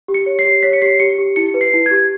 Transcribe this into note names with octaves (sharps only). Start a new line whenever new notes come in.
G4
C#7
C#5
C7
G4
C#5 B6
C#7
G4 C7
G4 C#7
G4
E4 C#7
B4
C7
E4
G4 G#6